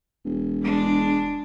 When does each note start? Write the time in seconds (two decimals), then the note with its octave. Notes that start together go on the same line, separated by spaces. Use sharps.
0.25 E1
0.62 G#3 D4